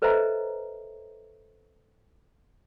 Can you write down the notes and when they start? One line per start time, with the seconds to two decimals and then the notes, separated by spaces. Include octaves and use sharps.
0.02 A4 B4 C5 D#5 E5 A#5